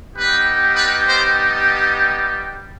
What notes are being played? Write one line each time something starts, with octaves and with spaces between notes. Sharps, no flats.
G3 B3 D#4 G4 B4
B4
C5